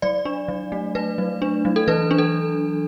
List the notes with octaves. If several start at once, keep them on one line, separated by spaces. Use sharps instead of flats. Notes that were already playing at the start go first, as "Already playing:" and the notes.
F#3 D5
D4
F#3
A3
A3 B4
F#3
D4
F#3
A4
E3 B4
D4
A4